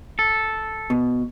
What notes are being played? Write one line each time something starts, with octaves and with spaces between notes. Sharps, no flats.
A4
B2